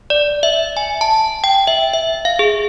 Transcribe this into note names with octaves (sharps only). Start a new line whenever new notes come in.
D5
E5
G#5
A5
G5
E5
E5
F5
G#4